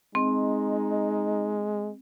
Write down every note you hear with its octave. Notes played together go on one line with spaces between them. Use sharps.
G#3 C4 D#4